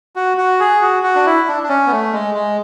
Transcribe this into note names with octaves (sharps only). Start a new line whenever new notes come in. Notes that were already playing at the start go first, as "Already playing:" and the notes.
F#4
F#4
G#4
F#4
F#4
D4
E4
D4
D4
C#4
B3
A3
G#3
G#3